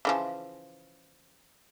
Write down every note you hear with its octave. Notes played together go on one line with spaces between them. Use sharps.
C#3 E3 F3